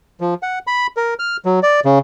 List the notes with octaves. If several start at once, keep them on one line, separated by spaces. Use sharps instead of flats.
F3
F#5
B5
A#4
F6
F#3
D5
C#3